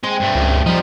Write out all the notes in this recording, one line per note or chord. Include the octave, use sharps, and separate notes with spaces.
G#3 C4 C6
G2 A3
C#2
F3 G3 D#4